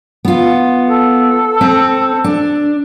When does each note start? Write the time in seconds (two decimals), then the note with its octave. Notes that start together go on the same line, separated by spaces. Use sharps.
0.25 B3 F4
0.88 A4
1.61 C4
2.24 D4